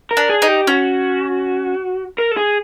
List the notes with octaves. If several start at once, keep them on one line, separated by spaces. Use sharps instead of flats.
A#4
D4
G#4
D#4
G4
C#4 F#4
A#4
A4
G#4